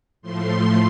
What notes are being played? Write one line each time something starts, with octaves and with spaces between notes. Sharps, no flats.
A2 F3 A3 C6